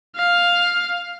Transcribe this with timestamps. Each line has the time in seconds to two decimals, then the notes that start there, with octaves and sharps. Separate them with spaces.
0.16 F5